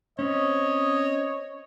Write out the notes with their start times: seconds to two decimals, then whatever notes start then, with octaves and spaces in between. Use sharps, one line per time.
0.19 C4 C#4 C#5 D#5